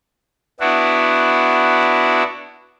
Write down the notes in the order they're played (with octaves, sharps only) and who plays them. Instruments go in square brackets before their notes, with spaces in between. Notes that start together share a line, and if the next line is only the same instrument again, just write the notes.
[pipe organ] B3 D4 E4 F#4